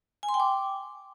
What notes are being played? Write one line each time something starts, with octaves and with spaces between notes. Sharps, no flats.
G#5
C6
G5
D6